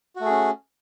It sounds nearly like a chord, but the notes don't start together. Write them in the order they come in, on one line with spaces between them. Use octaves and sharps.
F#4 A3 G#4 C#4